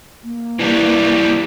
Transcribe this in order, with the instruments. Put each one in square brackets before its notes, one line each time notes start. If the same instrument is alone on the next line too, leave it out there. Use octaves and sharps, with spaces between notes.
[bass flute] A#3
[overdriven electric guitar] E3 G3